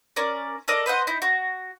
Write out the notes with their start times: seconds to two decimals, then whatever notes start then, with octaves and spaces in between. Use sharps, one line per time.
0.16 C#4 A#4 D5
0.68 A4 A#4 D5 D#5
0.86 B4 C5 D#5 F#5
1.07 D#4 E4
1.22 F#4